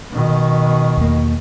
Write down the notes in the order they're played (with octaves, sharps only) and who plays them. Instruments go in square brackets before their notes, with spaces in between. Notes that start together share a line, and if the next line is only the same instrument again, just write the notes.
[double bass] B2 D#3
[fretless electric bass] E2 A#3